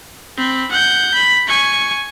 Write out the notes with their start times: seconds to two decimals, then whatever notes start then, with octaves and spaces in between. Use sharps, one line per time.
0.38 C4 B5
0.72 F#5 G6
1.15 B5
1.48 G#5 C#6